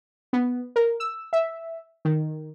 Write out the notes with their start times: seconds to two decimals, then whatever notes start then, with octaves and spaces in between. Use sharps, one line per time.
0.33 B3
0.76 A#4
1.00 E6
1.33 E5
2.05 D#3